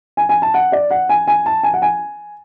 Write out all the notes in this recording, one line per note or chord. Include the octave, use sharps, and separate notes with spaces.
G#5
G#5
A5
F#5
D5
F#5
G#5
G#5
A5
G#5
F#5
G#5